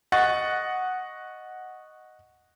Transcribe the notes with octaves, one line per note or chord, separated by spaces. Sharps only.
D#5 F#5 C#6 F#6 A6